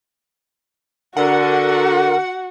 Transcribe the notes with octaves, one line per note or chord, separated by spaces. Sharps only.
D3 F#4 A#4 F#5